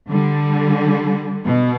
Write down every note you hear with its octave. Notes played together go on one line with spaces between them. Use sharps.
D3 G3
B2